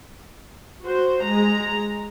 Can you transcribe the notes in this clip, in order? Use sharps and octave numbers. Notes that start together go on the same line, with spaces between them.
F#4 C5
G#3 A#5